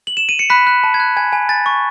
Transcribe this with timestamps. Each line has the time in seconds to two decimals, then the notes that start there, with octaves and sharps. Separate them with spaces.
0.07 F#7
0.17 E7
0.29 D#7
0.39 C#7
0.50 B5 F#6 B6
0.67 F#6
0.84 A5
0.94 G#6
1.00 F#6
1.17 G#5 G#6
1.33 G#5
1.49 G#5 A6
1.66 C#6